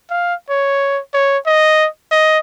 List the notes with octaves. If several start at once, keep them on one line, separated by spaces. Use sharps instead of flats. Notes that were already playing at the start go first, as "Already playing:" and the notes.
F5
C#5
C#5
D#5
D#5